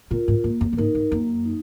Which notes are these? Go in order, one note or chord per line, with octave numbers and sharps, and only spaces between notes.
A#2 F4 A#4
G#2
G#2 A#3
F#2
F#2
G#2 D#4 A#4
G#2
F#2 A#3
D#4